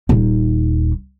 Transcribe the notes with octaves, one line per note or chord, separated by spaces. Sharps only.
D#1 D#4